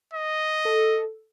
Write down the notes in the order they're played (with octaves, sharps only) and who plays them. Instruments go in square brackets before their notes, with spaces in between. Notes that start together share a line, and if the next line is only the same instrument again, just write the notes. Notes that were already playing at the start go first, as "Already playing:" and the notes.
[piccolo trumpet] D#5
[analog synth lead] A4